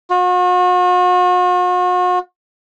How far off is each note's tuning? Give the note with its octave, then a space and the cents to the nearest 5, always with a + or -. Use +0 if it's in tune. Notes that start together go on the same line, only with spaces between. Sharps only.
F#4 -45